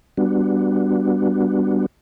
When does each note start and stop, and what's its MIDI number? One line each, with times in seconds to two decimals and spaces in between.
0.17 1.86 55
0.17 1.86 59
0.17 1.86 62
0.17 1.86 66